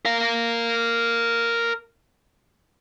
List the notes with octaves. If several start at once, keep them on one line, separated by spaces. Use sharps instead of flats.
A#4 F5